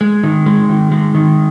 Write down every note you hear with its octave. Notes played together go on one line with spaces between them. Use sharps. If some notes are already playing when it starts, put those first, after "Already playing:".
G#3
D#3
G#3
D#3
G#3
D#3